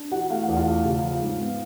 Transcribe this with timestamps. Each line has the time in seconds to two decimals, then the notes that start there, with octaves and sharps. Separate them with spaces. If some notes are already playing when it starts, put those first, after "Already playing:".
Already playing: D4
0.11 E3 F#4 F#5
0.30 A3 F5
0.43 F#5
0.48 E2
0.56 F4 F5
0.67 A3
0.84 C#3
1.03 F3
1.21 G#2
1.40 B3